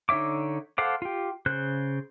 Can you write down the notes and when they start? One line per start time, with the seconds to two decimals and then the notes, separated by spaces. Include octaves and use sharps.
0.09 D3 D#4 C#5 E5 D6
0.78 A4 C5 F5 F#5 D6
1.02 F4 G4
1.46 C#3 C5 F#6